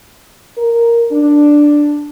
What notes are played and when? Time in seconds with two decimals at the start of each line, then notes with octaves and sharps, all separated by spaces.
0.57 A#4
1.12 D4